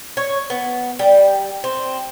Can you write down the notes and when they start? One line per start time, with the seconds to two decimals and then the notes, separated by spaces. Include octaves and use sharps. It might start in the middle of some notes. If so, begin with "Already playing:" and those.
0.17 C#5
0.50 B3
0.99 G3
1.64 C4